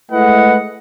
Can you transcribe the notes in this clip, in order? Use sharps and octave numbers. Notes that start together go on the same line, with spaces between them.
G#3 A3 E4 B4 D#5 F#5